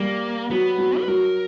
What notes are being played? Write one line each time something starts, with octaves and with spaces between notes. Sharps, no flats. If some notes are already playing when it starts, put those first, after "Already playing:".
Already playing: G3 A#3
F#3 B3
F#3
B4
F#3 A#4